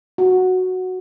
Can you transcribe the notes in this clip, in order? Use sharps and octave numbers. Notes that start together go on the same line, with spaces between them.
F#4